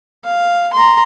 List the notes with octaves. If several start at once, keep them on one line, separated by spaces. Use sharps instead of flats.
F5
A#5 C6